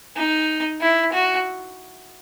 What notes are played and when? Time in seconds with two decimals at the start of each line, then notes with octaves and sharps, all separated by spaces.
0.16 D#4
0.81 E4
1.13 F#4